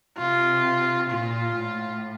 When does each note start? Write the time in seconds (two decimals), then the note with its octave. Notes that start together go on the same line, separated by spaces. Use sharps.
0.18 C3 F4
1.10 A#2 F4
1.55 A2